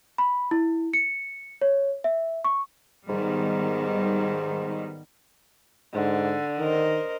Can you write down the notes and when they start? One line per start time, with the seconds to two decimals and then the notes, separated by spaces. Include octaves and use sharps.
0.18 B5
0.51 E4
0.93 C#7
1.62 C#5
2.04 E5
2.44 C#6
3.09 G#2 D#3 G3 B3
5.94 G#2 D3
6.59 D#3 A#4 C5 D#5